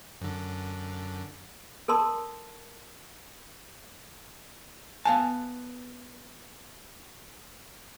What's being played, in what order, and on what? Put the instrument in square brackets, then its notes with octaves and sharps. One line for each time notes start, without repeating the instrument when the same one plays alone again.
[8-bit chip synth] F#2 D3
[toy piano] A4 A#4 A5 C6
[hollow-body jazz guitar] B3 F5 A5 [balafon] G#5